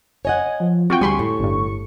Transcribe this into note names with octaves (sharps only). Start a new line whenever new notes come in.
C#5 D#5 F#5 G#5
F3
C4 F4 F#4 G5 C#6
D2 G3 G4 G#5 B5 C6
A2
G1 G2